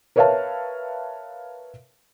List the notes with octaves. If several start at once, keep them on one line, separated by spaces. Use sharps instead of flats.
A#4 B4 C#5 E5 F5 A5